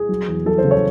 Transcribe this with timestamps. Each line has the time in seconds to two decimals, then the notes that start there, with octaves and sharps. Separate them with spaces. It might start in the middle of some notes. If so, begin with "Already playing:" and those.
Already playing: G#4
0.09 F#3
0.28 E2
0.46 F#3 A4
0.58 C5
0.64 C#3
0.71 C#5